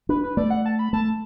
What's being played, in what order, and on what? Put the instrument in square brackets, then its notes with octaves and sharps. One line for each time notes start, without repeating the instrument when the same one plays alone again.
[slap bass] D4 [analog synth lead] B4
[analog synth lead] B4
[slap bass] A3 [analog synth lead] D5
[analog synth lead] F#5
A5
B5
[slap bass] A3 [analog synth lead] A5